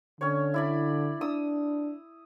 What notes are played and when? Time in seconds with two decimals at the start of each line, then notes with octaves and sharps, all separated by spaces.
0.21 D3 C#4 C#5
0.54 E4 D5 B5
1.21 D4 D#6 E6